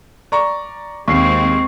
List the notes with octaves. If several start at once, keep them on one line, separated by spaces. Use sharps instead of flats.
D5 A#5 C#6
D#2 G#3 C4 C#6 C7